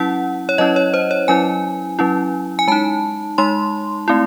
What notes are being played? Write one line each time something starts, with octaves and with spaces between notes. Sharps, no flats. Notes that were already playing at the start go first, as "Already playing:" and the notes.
Already playing: F#3 C#4 E4 F#5
C#5
F#3 C#4 E4 D#5
C#5
C5
C#5
F#3 C#4 E4 G#5
F#3 C#4 E4
G#5
G#3 D#4 A5
G#3 D#4 C6
A3 C4 E4